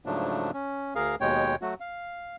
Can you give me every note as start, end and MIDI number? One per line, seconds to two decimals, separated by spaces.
0.06 0.51 44
0.06 0.51 49
0.06 0.51 53
0.06 0.51 54
0.06 0.51 57
0.06 0.51 62
0.53 0.94 61
0.95 1.15 38
0.95 1.15 68
0.95 1.15 70
0.95 1.15 77
1.21 1.55 39
1.21 1.55 47
1.21 1.55 56
1.21 1.55 73
1.21 1.55 79
1.62 1.74 54
1.62 1.74 57
1.62 1.74 66
1.80 2.36 77